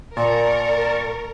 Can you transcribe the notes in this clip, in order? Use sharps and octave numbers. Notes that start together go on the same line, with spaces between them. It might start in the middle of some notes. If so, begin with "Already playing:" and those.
A#2 A#4 D5 A5 C#6